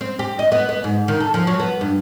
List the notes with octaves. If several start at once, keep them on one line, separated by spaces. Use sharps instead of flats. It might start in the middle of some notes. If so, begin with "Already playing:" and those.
C4
G4
D#5
B3
B3
G#2
D#3
A4
F3
F#3
B3
G2